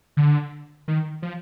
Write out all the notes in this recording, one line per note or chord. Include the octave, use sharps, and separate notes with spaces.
D3
D#3
F3